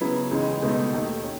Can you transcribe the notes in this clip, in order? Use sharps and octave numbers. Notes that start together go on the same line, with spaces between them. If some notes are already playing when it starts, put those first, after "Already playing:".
C#3 F#3 B3 E4
C#2 C#3 E3 G#3 D#4
C#2 B2 A3 D#4
D#2 D#3 A3
C#4